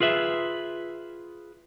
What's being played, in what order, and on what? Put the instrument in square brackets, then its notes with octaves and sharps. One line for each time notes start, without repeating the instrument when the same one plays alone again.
[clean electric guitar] F4 G#4 B4 E5